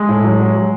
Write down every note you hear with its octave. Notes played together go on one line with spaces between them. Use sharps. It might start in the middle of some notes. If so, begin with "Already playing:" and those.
Already playing: G#3
A2
F#3
F#3
F#3